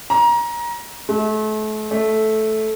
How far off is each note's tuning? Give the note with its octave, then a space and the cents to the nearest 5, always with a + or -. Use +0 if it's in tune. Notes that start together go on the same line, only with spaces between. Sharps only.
A#5 +25
A3 -35
A3 -10